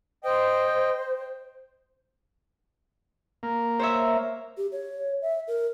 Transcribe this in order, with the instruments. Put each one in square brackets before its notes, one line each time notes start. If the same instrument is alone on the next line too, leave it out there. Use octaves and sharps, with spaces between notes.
[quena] C5 [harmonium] D#5 G5
[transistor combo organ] A#3
[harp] C5 C#5 E5
[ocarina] G4
C#5
E5
A#4